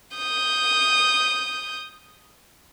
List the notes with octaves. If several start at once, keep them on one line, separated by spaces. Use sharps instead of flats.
D#6 G6